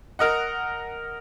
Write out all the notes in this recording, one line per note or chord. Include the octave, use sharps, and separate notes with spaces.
A#4 D#5 F#5